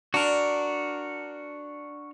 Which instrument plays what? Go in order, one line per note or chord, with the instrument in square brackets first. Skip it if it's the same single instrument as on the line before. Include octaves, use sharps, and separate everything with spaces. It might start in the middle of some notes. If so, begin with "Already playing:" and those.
[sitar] D4 [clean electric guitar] F#4 A#4